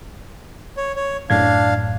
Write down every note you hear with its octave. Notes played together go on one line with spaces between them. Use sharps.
C#5
C#5
F#2 A2 D4 F5 G#6